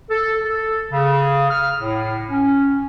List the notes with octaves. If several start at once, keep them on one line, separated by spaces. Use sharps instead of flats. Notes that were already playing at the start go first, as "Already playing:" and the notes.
A4
A4
C#3
F6
A2
C#4